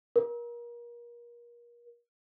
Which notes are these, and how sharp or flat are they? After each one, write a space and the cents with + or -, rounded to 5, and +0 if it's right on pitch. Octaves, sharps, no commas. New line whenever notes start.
A#4 +35